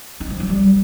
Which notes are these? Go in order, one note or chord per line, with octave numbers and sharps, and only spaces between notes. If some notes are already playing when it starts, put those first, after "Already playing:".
D#4
F3
F#3
G3